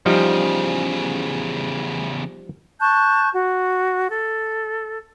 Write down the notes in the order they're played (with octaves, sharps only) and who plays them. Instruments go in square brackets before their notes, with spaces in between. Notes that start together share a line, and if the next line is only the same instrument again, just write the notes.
[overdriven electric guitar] E2 C#3 [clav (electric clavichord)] F3 G3 D#4
[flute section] A5 C#6 F#6 G6
F#4
A4